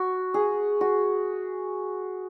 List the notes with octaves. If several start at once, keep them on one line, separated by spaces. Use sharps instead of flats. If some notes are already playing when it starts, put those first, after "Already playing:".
Already playing: F#4
G#4
F#4